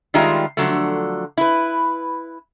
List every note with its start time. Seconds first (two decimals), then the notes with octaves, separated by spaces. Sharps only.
0.14 D#3 G3 G#3 F4 E5 A#5
0.57 D3 F3 F#3 A3
1.38 E4 B4